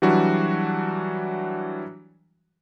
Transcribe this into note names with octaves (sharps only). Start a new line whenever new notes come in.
E3 F#3 G3 D4 F#4